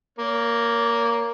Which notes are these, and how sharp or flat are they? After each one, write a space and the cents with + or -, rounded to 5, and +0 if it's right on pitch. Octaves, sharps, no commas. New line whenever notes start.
A#3 +0 C#5 +40